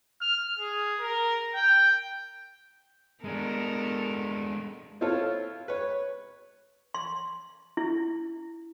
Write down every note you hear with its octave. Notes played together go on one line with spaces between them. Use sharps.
F6
G#4
A#4
G5
G#3 B3 D4 A4 A#4
C4 E4 F4 A4 C#5
B4 C#5
C6
E4